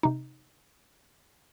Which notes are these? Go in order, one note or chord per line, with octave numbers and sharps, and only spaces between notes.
C3 D#4